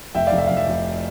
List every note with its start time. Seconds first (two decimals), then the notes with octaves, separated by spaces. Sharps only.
0.15 F1 E5 G5
0.27 D5 F5
0.32 F1
0.38 E5
0.47 F1 F5
0.57 E5
0.68 F1